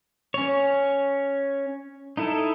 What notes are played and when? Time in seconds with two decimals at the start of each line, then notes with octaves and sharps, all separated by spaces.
0.34 C#4 C#5
2.17 D#4 E4 A4